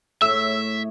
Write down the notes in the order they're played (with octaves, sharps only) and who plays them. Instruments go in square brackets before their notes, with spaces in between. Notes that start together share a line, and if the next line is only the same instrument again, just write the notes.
[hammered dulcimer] A2 C#5 [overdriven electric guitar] E5 [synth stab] E6